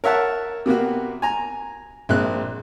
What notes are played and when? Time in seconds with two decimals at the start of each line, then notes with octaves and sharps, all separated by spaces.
0.04 A#4 C#5 E5 F#5 A5
0.66 C3 A#3 B3 F#4
1.22 G#5 A#5
2.09 A#1 G#3 C4 F#6